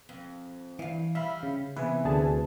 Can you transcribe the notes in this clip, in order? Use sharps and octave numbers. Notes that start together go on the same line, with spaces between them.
F2
G2 E3 F5
G3 E5 F5 B5
C#3
C3 E3 B3 B4 G#5
D2 G#4 A5